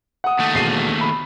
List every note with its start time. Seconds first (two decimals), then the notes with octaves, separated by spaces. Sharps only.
0.24 F#5 D#6
0.39 D#2 A3
0.54 E1 C7 D#7
1.01 B5